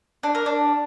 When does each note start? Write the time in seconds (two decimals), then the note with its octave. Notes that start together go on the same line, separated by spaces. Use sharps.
0.23 D4
0.35 A#4
0.46 D4